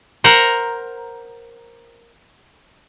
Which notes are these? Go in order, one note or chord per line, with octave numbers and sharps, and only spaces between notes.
A#4 C5 F#5 A#5